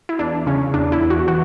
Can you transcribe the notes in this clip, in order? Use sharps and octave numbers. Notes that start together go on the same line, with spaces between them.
E4
E2 D4
C#3 C#4
E2 D4
E4
E2
F#4
E3 F#4